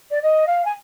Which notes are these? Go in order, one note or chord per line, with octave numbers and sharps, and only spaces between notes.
D5
D#5
F5
G#5